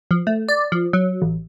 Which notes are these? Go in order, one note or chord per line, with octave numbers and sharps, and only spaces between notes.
F3
A3
D5
F3
F#3
A1